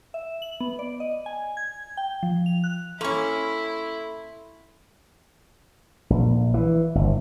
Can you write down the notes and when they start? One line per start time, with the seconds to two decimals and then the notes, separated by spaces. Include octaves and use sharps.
0.14 E5
0.42 F#7
0.60 B3
0.79 D5
1.00 D#5
1.26 G#5
1.57 G#6
1.97 G5
2.23 F3
2.46 F7
2.64 F#6
3.01 A#3 C#4 E4 A4 C6 C#6
6.10 A#1
6.54 E3
6.95 G1